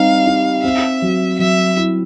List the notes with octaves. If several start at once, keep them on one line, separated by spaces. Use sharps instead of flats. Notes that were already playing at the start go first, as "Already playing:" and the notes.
Already playing: G3 C4 D#4 F5
D#4
C4 E5
F#3
F#3 E5
E4